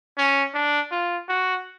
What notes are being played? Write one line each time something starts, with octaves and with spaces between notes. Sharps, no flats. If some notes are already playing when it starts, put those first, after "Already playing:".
C#4
D4
F4
F#4